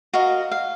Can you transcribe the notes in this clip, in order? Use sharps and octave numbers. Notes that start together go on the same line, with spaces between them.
F#4 A#4 D#5 F5
F5